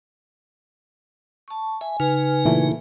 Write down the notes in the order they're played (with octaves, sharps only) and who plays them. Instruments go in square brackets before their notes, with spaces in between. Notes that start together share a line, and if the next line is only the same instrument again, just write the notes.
[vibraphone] A5 C#6
[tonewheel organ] E5 [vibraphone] G#5
[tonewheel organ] C#3 D#4 [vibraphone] B4 G#5 [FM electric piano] F6
[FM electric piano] A#2 E3 A3